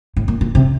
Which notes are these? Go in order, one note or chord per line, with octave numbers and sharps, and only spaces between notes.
A2
A#2
A#2
C3